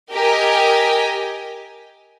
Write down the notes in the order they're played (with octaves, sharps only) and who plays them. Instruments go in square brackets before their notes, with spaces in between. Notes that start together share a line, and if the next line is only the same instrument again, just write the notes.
[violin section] G4 A#4 D#5 G#5